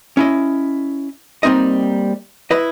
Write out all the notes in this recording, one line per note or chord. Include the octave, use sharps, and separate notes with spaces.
C#4 E4 D#5
G3 A#3 C4 D#4 D#5
E4 B4 D#5